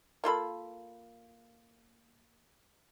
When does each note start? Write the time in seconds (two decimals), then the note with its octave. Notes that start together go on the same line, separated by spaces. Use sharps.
0.24 A#3 F4 A4 B5